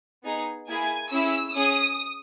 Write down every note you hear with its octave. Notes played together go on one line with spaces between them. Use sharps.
B3 D#4 G#4
A#3 E4 G#4 G#5
C#4 E4 G#4 E6
C#4 G#4 D#6